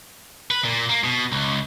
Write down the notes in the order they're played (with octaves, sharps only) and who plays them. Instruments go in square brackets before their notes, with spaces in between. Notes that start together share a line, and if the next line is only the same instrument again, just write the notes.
[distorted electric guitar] B4
A#2
A#3
B2
C#2